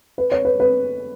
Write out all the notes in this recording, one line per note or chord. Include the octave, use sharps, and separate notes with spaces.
B4
C#5
B4
B4